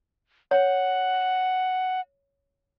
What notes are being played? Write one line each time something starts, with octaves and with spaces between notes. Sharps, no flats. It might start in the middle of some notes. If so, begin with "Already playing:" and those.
C#5 F#5